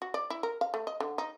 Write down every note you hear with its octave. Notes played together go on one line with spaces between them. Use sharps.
F#4
D5
E4
A#4
F5
A3
D#5
D3
D#4